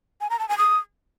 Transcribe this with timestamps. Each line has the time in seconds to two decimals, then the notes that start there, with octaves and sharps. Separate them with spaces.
0.21 G#5
0.30 A#5
0.39 A5
0.49 G#5
0.58 D#6